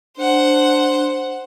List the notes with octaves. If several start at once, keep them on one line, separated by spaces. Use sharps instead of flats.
D4 C5 F#5